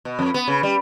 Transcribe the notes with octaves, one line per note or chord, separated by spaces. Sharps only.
B2
F2
B3
C#3
G3